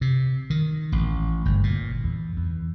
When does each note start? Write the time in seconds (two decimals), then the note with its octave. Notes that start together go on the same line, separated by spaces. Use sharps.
0.01 C3
0.50 D#3
0.92 A1
1.45 G1
1.63 A#2
2.04 E2
2.37 E2